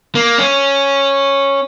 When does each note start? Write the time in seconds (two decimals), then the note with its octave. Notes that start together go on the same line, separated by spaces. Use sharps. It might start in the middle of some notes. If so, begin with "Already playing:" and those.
0.15 A#3
0.38 C#4